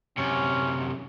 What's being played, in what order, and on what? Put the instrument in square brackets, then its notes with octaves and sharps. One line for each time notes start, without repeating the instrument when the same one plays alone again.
[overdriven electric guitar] F#2 C3 [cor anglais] C#4